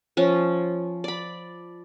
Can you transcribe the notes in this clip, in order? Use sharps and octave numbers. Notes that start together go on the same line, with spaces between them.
F3 C#4
D5 B5